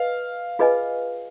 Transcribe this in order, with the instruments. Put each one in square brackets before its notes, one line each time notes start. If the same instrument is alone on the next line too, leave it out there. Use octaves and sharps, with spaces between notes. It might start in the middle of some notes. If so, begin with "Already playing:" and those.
Already playing: [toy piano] B4 D#5 [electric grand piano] F5
[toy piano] F4 G#4 B4 D#5 G#5